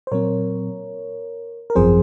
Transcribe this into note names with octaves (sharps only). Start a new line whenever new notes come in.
C5
A#2 F#3 C4 A#4 C#5
A#4
G#1 F#2 F3 C4 G#4 C5